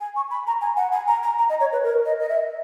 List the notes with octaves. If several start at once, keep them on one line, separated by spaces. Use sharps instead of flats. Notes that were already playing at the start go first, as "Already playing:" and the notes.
G#5
C#6
B5
A#5
G#5
F#5
G#5
A#5
A#5
A#5
D#5
C#5
B4
A#4
D#5
D#5
E5